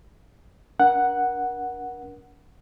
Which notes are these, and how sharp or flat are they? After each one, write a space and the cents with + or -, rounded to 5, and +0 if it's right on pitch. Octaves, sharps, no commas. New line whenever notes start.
D4 -35 A#4 +35 F#5 +0